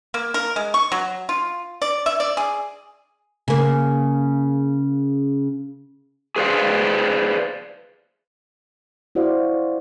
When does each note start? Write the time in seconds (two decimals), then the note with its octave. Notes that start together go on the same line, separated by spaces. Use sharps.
0.14 A#3
0.34 A#4
0.56 G#3
0.74 C#6
0.92 F#3
1.29 F4
1.82 D5
2.06 E5
2.20 D5
2.37 G#4
3.48 C#3 A#3
6.36 G#4 B4 C5 D5 F5
9.15 E4 F#4 C5 D5 E5 F5